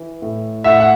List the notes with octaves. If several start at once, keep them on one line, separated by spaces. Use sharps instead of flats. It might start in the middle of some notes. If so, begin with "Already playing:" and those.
Already playing: E3
A2
A2 E5 F#5
F#5